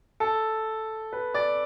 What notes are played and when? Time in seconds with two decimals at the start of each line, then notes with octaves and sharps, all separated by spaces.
0.20 A4
1.13 B4
1.34 D5